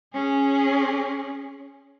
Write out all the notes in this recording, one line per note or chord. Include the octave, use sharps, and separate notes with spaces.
C#4 G#4